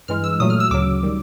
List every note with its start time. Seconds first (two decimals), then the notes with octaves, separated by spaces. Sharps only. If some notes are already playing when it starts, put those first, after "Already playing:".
0.08 G2 E3 G#3 F6
0.24 E6
0.40 A#2 F#3 A3 D#6
0.50 F6
0.60 E6
0.71 D2 C#3 F#3 D6
1.03 D#3 G3